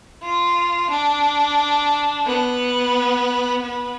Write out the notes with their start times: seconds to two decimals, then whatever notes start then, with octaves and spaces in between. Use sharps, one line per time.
0.23 F4
0.91 D4
2.27 B3
3.63 B3